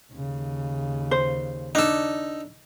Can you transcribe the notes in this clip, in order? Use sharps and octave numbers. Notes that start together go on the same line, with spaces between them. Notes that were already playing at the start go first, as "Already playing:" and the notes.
D#2 C#3
C5
D4 D#4 A4